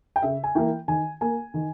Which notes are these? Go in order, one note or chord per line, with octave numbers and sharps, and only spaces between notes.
G5
C#3 E5
G#5
E3 A#3 G5
D#3 G#5
A#3 G#5
D#3